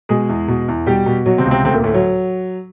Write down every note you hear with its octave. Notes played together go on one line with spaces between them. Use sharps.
B2 G#3 G#4
E2
B2
E2
B2 G3 G4
B2
B2 F#3 F#4
C3 C4
C#2
C3 C4
D2 C3 C4
A#2 A#3
D2 A2 A3
F#3